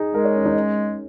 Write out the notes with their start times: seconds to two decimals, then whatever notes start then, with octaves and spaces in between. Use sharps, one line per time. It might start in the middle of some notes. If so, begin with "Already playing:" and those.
Already playing: D#4 G#4
0.14 G#3 A#4
0.24 C#5
0.35 C#4
0.46 D#4
0.56 C#4